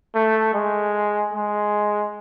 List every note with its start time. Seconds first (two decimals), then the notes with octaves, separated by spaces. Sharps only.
0.15 A3
0.54 G#3
1.34 G#3